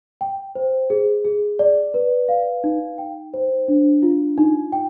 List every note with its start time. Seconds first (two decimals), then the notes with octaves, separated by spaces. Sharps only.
0.21 G5
0.55 C5
0.90 G#4
1.25 G#4
1.59 D5
1.94 B4
2.29 F5
2.64 D#4
2.98 G5
3.34 C5
3.68 D4
4.02 F4
4.38 D#4
4.72 G5